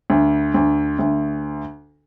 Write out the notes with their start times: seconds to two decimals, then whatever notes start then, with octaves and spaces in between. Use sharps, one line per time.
0.10 D2
0.54 D2
0.99 D2